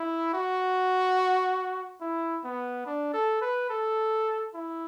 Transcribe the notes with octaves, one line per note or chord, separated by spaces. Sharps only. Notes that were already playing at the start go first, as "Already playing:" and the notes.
Already playing: E4
F#4
E4
B3
D4
A4
B4
A4
E4